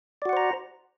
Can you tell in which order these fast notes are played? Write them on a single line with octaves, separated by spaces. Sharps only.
D5 F#4 F#5 C5 A#5